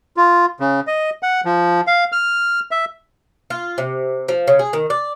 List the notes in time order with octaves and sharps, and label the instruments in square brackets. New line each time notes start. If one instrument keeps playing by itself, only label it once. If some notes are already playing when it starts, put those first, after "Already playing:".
[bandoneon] F4
C#3
D#5
F#5
F3
F5
F6
E5
[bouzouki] F4
C3
F3
C#3
G#4
D#3
D5